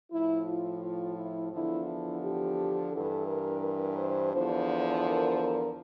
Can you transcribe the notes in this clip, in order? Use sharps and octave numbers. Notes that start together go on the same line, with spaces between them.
A2 F3 E4
F4
F4
E4
E2 D3 F3 E4
E4
G4
G2 E3 A4
A#4
A#4
C5
E2 D3 F3 C5
A#4
A#4